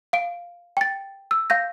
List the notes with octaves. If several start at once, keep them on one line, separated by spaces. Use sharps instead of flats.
F5 D7
G5 A6
E6
F5 G6 A#6